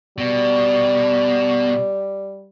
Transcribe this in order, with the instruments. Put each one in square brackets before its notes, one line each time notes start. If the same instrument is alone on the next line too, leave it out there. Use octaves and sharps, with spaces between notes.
[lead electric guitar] B2 [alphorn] G3